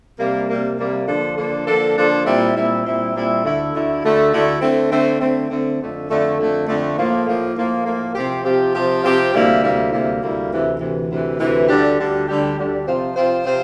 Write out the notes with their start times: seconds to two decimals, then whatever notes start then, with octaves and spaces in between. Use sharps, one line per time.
0.19 C3 G3 A#3
0.49 C3 G3 A#3
0.78 C3 G3 A#3
1.08 D3 F3 A#3 D4 A4
1.37 D3 F3 A#3 D4 A4
1.67 D3 F3 A#3 D4 A4
1.96 D3 F3 A#3 D4 A4
2.25 A#2 G3 C4 E4
2.54 A#2 G3 C4 E4
2.85 A#2 G3 C4 E4
3.14 A#2 G3 C4 E4
3.44 D2 D3 A3 E4
3.73 D2 D3 A3 E4
4.02 D2 D3 A3 E4
4.32 D2 D3 A3 E4
4.61 D3 A3 C4
4.91 D3 A3 C4
5.20 D3 A3 C4
5.50 D3 A3 C4
5.79 F2 D3 A3
6.09 F2 D3 A3
6.38 F2 D3 A3
6.68 F2 D3 A3
6.97 A2 F3 A#3
7.26 A2 F3 A#3
7.56 A2 F3 A#3
7.85 A2 F3 A#3
8.15 C3 F3 C4 G4
8.44 C3 F3 C4 G4
8.74 C3 F3 C4 G4
9.03 C3 F3 C4 G4
9.33 D2 C3 G3 A#3 E4
9.62 D2 C3 G3 A#3 E4
9.92 D2 C3 G3 A#3 E4
10.21 D2 C3 G3 A#3 E4
10.51 D2 C3 E3
10.80 D2 C3 E3
11.09 D2 C3 E3
11.39 D2 C3 E3
11.68 D2 D3 G3 D4 G4
11.98 D2 D3 G3 D4 G4
12.27 D2 D3 G3 D4 G4
12.57 D2 D3 G3 D4 G4
12.86 C3 F3 C4 F4 C5
13.16 C3 F3 C4 F4 C5
13.45 C3 F3 C4 F4 C5